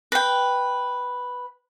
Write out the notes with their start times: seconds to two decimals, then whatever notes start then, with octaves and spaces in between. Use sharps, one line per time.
0.12 B4 G5